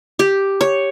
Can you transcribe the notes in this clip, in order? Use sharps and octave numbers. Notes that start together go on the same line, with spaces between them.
G4
C#5